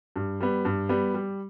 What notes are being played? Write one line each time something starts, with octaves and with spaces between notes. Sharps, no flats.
G2
G3 B3
G2
G3 B3
G3